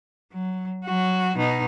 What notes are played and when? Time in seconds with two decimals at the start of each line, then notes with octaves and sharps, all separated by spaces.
0.33 F#3
0.85 F#3 F#4
1.36 B2 D#4